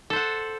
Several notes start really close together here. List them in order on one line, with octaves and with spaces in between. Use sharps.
A4 C5 F#5